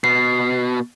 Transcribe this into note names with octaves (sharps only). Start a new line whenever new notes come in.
B2 C7